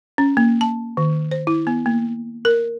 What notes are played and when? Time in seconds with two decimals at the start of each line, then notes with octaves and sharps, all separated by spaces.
0.18 C#4
0.37 A#3
0.61 A5
0.97 D#3
1.31 C5
1.47 E4
1.67 B3
1.86 A#3
2.45 A#4